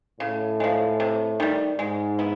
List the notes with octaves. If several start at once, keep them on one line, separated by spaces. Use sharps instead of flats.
A2 C#3
F3 G#3
C3
D#3 G3
G#2 G#3
B3 E4